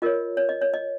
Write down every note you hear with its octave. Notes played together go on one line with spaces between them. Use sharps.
F4 A#4 C#5 D#5
C#5
D#5
C#5
D#5